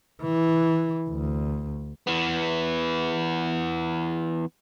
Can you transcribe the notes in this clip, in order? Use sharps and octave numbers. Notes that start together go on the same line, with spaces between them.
E3
D2
E3 B3